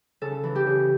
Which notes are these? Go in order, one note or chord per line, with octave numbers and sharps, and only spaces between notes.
C#3 A4
E3
G4
C#3